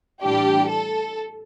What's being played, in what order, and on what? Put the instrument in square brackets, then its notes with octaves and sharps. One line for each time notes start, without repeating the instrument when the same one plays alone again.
[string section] A2 E3 G3 D4 G4
A4